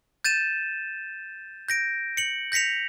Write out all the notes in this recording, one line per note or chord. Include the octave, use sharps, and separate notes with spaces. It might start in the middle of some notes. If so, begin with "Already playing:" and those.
G6 A6 D#7 E7
G6 A#6 D7
C#7 F#7
G6 A#6 B6 C#7 F7